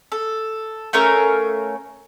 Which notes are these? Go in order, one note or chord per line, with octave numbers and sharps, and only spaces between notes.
A4
A3 C#4 A#4 F5